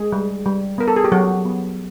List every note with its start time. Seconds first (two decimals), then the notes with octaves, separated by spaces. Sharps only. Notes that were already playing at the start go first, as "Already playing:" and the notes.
Already playing: G#3 G#4
0.12 G3
0.46 G3
0.78 B3 A#4
0.88 A4
0.96 G#4
1.04 G4
1.12 F#3 F#4
1.45 B3